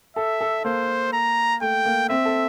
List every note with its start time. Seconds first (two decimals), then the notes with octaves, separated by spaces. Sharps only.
0.16 A4 E5
0.41 A4
0.65 A#3 C5
1.13 A#5
1.61 A3 G5
1.86 A#3
2.09 C4 E5
2.25 A4